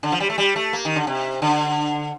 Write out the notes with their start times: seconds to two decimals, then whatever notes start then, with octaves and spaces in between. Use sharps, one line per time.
0.03 D3
0.12 F3
0.20 G3
0.30 A3
0.38 G3
0.56 A3
0.73 A#3
0.85 D#3
0.96 D3
1.07 C3
1.42 D3